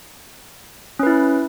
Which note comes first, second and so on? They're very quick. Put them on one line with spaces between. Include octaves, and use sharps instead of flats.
C#4 B4 E4